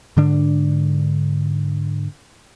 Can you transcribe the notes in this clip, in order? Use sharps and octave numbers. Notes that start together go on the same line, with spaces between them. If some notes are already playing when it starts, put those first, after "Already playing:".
G#2 D3 D4